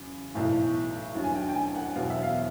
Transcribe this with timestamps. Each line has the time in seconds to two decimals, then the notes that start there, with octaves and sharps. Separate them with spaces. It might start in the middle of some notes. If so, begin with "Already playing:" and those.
Already playing: E2 C#3 F#3
0.34 B1 A2 E3
1.15 D#2 D3 F#3
1.24 G#5
1.35 G5
1.49 G5
1.55 G#5
1.76 F#5
1.96 E2 B2 F#3 F5
2.10 E5
2.23 F5